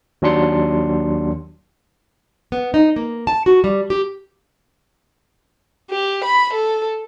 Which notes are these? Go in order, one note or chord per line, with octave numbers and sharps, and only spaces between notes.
D#2 F#3 D4 C6 C#7
B3
D#4
A#3
A5
F#4
G3
G4
G4
B5
A4